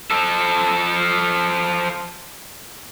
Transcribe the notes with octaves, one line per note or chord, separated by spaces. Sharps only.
F3 A4